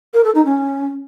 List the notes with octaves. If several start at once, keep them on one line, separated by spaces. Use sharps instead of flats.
A#4
A4
D#4
C#4